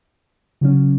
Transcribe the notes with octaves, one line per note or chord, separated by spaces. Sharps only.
C#3 F#3 C#4